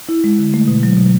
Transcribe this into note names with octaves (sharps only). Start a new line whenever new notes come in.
E4
G#3
D3
A3
B2
F#3
B2